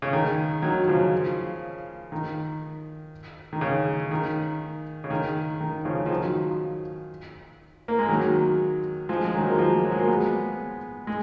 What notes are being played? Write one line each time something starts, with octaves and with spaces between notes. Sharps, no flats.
C#3
D#3
D#3 F#3
C#3 F3
D#3
D#3
C#3
D#3
C#3
D#3
D#3
C#3 F3
F3
D#3 F#3
A#3
G#3
D#3 F#3
F3 G#3
G#3
D#3 F#3
A#3
F3 G#3
F#3
G#3
A#3
G#3 B3
G#3